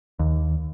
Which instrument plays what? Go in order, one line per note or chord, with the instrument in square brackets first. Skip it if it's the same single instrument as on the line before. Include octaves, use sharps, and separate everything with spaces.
[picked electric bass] D#2